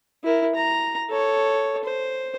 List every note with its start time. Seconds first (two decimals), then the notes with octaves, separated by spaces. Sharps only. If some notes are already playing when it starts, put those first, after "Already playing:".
0.24 E4 A#4
0.55 A#5
1.10 A4 C#5
1.84 C5